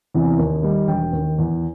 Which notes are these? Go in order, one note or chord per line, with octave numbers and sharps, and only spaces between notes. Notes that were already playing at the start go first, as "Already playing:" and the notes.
E2 C3 E3
D#2
D#3 G3
E1 G5
D#2
D#3
E2